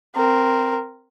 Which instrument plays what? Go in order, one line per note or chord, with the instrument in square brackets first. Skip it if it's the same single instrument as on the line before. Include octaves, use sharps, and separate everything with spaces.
[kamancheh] C4 A#4